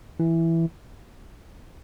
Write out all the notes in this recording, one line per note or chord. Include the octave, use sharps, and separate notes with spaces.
E3